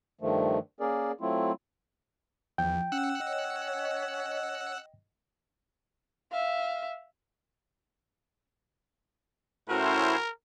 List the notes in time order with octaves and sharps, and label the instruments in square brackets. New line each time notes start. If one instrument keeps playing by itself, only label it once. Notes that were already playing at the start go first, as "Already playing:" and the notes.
[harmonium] G2 D#3 F3 A3
A#3 C#4 G#4 A#4 D5
F#3 A3 C4 E4 F4
[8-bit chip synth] E2 [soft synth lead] F3 [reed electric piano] G5
[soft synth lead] C#4 [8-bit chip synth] F#5 E6 F#6
[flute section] C#4 C#5 [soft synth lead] D#5
[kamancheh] E5 F5
[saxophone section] A2 F#4 [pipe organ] C#4 E4 C5 [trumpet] A#4